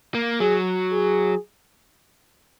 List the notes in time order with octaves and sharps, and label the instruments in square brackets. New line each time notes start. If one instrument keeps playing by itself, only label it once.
[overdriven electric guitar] A#3
[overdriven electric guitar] F#3 [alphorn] G#4
[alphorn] G#4